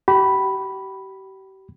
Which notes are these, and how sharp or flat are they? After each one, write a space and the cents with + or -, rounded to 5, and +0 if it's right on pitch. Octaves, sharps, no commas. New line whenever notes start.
G4 -40 B5 +0